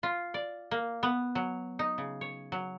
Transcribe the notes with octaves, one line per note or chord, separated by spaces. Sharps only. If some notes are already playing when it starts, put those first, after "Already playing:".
F4
D5
A#3
B3
F#3
D#4
C#3
C#5
F#3